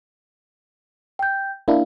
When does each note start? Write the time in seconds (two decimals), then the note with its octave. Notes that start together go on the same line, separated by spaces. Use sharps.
1.19 G5 G6
1.68 A#3 D4 E4 F5